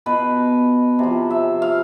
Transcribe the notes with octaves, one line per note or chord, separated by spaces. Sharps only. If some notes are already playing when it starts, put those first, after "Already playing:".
B2 B4
C3 F3
E5
F5